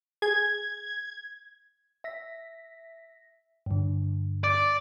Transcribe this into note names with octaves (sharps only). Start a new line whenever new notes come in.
G#4 G#6
E5 A#6 B6
G2 D3
D5